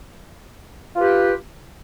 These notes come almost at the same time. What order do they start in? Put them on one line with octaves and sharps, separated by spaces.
F4 B4 G4